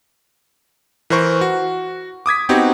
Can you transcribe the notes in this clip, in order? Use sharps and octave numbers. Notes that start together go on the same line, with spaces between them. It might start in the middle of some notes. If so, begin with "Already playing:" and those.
E3 A#4 C5 C#6
F#4
D6 D#6 G#6 B6
B3 C4 D#4 F#4 G4